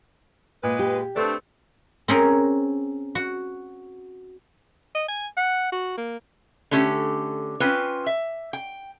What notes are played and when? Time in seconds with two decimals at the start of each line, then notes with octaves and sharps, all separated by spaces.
0.63 A#2 G#3 B4
0.79 G4
1.16 A3 C4 D4 A4 B4
2.08 C4 C#4 G#4 A#4
3.15 F#4
4.95 D#5
5.08 G#5
5.37 F#5
5.72 F#4
5.97 A#3
6.71 D3 A3 C#4 G4
7.60 C4 C#4 F4 B4
8.06 E5
8.53 G5